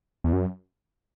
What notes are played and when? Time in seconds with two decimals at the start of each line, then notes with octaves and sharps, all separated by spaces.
0.24 E2
0.33 F#2